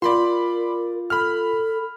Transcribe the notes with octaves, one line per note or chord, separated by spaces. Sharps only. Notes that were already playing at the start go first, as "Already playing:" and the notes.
F4 A#4 D5 B5 C6
A4 B5 F6